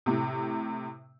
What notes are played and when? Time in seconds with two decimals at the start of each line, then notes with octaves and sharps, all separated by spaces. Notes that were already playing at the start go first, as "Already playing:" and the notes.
0.06 A2 C3